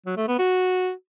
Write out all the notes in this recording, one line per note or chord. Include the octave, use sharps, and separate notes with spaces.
F#3
A3
B3
F#4